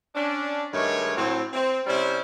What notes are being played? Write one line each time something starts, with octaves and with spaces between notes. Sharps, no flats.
C#4 D4
G2 D#3 G#3 A3 C#5
A2 F#3 C4
C4
C3 G3 C4 C#4 E4